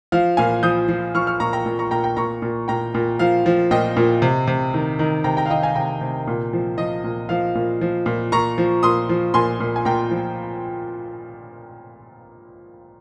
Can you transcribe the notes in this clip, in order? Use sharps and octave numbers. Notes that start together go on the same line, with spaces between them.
F3 F5
A#2 F5 G#5
F3 D#6 G6
F3
F3 C#6 F6
C#6 F6
A#2 A#5 C#6
G5 A#5
A#2
A#5 C#6
A#2 G5 A#5
G5 A#5
A#2 A#5 C#6
A#2
A#2 G5 A#5
A#2
F3 F5
F3
A#2 D#5 G5
A#2
C3
C3
D#3
D#3
C3 G5 A#5
G5 A#5
F5
D#3 D#5 G5
F5 G#5
C3 G5 A#5
C3
A#2
F3
F3 D#5
A#2
F3 F5
A#2
F3
A#2
A#2 A#5 C#6
F3
A#2 C6 D#6
F3
A#2 G#5 C6
A#2
G#5
A#2 G5 A#5
F3